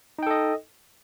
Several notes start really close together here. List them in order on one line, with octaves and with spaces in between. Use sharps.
D#4 G5 A4 D#5